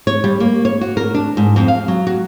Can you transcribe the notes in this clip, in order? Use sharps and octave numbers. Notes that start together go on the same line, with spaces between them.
C#5
G3
A#3
C#5
F#4
A#4
D4
G#2
F2
F5
F#3
F#4